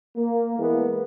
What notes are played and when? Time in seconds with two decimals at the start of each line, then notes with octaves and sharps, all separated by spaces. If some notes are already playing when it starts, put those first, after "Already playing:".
0.16 A#3
0.58 E3 G#3 A#3 B3